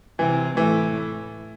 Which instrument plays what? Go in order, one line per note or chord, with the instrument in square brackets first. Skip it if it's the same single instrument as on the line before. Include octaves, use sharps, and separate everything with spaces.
[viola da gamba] C3 C4 [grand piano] E3
[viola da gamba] A2 A3 [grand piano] E3